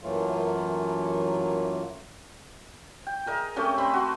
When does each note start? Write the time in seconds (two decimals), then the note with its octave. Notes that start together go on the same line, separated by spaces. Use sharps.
0.02 F#2 E3 F#3 A3 A#3 F4
3.07 G5
3.26 G#4 A#4 D#5 E5
3.56 A3 C4 C#4 G4
3.78 C4 D#5 B5 C6
3.94 F#4 E5 C6